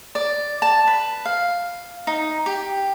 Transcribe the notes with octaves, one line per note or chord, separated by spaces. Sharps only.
D5
A5
B4
F5
D#4
G4